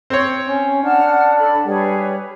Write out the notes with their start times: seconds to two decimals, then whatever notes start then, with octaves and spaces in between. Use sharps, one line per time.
0.10 C4 C#5
0.48 C#4
0.84 D4 F#5 A5 F6
1.37 A4 B5
1.67 G3 G#4 B4 C#5